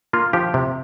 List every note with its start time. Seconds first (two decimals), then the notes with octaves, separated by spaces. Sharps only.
0.13 A#3 F4
0.33 F3 G4
0.54 C3